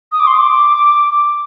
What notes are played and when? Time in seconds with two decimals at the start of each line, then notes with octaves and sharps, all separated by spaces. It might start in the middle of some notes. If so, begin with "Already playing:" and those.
0.12 D#6
0.20 D6
0.27 C6
0.35 D6